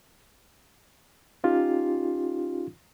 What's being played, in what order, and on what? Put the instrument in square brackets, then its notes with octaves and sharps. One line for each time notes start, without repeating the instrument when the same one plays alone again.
[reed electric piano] C#4 D#4 F4 G4